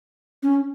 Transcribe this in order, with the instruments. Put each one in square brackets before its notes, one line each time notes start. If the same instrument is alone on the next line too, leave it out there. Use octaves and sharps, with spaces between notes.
[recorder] C#4